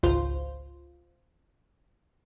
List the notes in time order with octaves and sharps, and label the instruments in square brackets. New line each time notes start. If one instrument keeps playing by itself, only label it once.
[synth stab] G#1 C#2 F4 C5